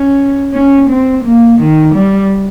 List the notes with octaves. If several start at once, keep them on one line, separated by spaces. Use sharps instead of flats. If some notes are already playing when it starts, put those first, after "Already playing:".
Already playing: C#4
C#4
C4
A#3
D#3
G3